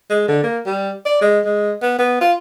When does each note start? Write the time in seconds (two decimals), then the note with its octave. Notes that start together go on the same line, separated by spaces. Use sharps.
0.10 G#3
0.28 D3
0.43 A#3
0.66 G3
1.05 D5
1.21 G#3
1.45 G#3
1.82 B3
1.99 B3
2.21 F4